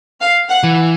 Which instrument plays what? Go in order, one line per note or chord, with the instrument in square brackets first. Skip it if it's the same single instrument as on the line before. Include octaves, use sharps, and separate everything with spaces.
[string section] F5
F#5
[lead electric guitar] E3